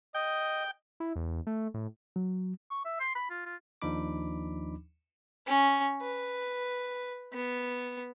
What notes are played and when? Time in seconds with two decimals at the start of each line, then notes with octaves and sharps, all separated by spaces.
0.14 D#5 G5
1.00 E4
1.16 E2
1.47 A3
1.74 A2
2.16 F#3
2.71 C#6
2.85 E5
3.00 C6
3.15 B5
3.30 F4
3.46 F4
3.82 D#2 F3 D4 D#4 B5 D6
5.46 C#4
6.01 B4
7.33 B3